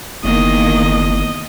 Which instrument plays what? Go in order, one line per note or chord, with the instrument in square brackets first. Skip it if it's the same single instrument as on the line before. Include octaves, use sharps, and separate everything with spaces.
[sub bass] F#1 [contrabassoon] E2 [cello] D#3 A#3 [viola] D#5